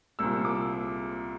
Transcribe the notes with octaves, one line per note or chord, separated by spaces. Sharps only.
C2 A#2 E6
D6